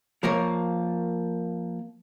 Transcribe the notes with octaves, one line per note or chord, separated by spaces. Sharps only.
F3 A#3 A#4 C#5